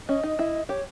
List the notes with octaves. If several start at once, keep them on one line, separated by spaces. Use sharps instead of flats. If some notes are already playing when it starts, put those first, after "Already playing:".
C#4 D#5
D#4
E4
G4 C#5